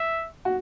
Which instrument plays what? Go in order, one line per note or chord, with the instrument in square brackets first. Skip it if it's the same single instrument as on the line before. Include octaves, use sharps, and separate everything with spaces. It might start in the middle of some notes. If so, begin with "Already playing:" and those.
Already playing: [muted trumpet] E5
[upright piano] F#4